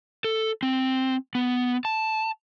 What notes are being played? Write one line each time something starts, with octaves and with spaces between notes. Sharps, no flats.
A4
C4
B3
A5